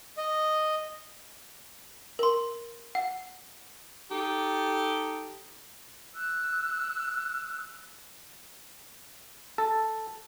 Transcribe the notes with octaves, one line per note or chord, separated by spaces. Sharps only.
D#5
A#4 C6
F#5
D#4 G4 A4
E6 F#6
A4